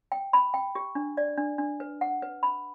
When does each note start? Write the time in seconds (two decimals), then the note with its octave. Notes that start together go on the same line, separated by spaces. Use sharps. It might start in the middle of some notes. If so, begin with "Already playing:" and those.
0.12 G5
0.33 B5
0.54 G5
0.75 G4
0.95 D4
1.17 D5
1.38 D4
1.58 D4
1.80 B4
2.01 F#5
2.22 B4
2.43 B5